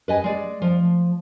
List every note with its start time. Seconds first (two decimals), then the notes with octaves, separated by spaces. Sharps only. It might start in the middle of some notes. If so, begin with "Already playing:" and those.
0.08 B4 D#5 G#5
0.24 G#3 D5
0.62 F3